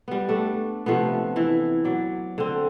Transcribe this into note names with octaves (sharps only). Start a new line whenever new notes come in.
G3 B3
A3 D4
C3 F3 A3 B3
E3 E4
F#3 D5
D3 C4